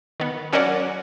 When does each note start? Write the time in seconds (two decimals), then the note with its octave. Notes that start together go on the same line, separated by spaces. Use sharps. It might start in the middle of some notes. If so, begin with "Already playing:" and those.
0.20 D#3 B3
0.53 F#3 C#4 F#4 A#4 D5 F#5